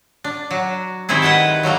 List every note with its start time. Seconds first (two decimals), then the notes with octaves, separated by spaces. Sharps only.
0.24 D4
0.51 F#3
1.09 D#3 G3 C4 E4 G#4
1.22 B4 F#5 G5 A5
1.63 F#3 G3 A3 A#3